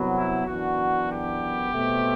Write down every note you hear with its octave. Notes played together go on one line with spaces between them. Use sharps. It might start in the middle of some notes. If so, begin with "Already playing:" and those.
Already playing: C2 C3 F#3 B3
E4
F#2 E3 B3 D4 F#4
G4
B2 A3 C4